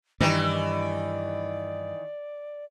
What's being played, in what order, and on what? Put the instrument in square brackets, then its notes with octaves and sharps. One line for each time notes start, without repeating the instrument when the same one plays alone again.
[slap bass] G2 [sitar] D#3 E3 [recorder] D5